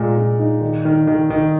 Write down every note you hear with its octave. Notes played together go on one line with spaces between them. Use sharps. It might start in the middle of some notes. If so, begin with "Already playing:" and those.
Already playing: A#2 G#3 D5
A#2
D#4
D#3
D#3
D#3
D#3